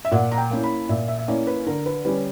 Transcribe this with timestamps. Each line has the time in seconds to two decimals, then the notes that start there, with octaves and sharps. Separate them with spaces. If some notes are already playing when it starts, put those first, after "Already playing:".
0.05 E5
0.11 A#2 F#5
0.31 A#5
0.38 G5
0.51 A#3 C#4 E4
0.63 B5
0.89 A#2 E5
1.08 E5
1.19 E5
1.28 A#3 C#4 E4 D5
1.47 B4
1.66 D3 A#4
1.86 B4
2.05 G3 C#4 B4